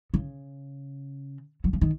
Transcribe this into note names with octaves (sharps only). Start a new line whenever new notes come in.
C#3
F#3
F3
D#3